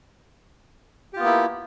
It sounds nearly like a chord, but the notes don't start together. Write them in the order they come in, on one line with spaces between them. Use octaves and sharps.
G4 F4 B3 A#3 E4